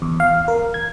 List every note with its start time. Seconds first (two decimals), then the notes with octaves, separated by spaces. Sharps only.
0.02 E2
0.20 F5
0.48 A#4
0.74 G#6